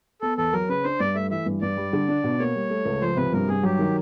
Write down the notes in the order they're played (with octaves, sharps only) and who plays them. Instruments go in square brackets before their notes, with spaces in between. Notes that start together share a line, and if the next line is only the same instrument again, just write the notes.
[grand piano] B3 [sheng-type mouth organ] A4
[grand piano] E2 [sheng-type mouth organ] A4
[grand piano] F#3 [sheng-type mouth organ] A#4
[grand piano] C#3 [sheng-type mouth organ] B4
[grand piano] D4 [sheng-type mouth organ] C5
[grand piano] G2 [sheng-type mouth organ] D5
[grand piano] A3 [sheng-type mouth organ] E5
[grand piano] E3 [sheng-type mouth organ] E5
[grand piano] G2
[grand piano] G2 [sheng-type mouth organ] D5
[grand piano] G3
D3
D4
B2
[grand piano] A#3 [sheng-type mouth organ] C#5
[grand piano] G3
A3
C#2
[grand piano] F3 [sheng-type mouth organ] C5
[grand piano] C3 [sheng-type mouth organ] B4
[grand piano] G2 [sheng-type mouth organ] A#4
[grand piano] G2 [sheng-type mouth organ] G#4
[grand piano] F#3 [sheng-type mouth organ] G4
[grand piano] D#3